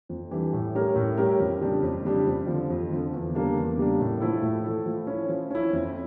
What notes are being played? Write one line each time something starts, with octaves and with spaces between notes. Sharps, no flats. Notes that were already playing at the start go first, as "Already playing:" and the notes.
F2
E3 G3 D4 G4
A2
G3 C#4 G4 A#4
A2
G3 C#4 G4 A#4
F2
C#3 G3 D4 G4
F2
C#3 G3 D4 G4
F2
D3 F3
F2
D3 F3
E2
C#3 G3 A#3 D4
E2
C#3 G3 A#3 D4
A2
F3 A3 E4 A4
A2
F3 A3 E4 A4
F3
C#4 E4
F3
C#4 E4
F2